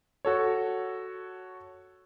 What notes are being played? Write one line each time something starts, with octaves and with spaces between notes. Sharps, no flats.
F#4 A4 C#5